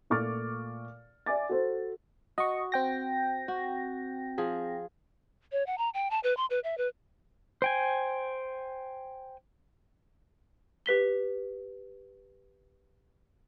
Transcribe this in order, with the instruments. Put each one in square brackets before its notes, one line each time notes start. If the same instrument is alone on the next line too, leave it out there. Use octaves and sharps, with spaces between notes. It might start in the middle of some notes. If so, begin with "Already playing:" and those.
[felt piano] A#2 A3 C#6 D6 F6 A6
D5 E5 G#5 D6 A6
F#4 A4 C5
[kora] F#4 [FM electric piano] D#5 C#6
[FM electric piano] C4 G5 A#6
[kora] F#4
F3 G#4
[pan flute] C#5
F#5
A#5
G5
A5
B4
C6
B4
E5
B4
[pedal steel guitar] C5 G5 G#5
[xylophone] G4 B4 B6 G7